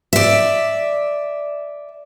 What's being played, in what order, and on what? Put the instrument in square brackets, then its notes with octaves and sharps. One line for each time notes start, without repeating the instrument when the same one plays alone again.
[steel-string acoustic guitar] D5 E5